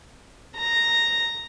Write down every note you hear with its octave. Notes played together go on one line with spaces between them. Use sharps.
A#5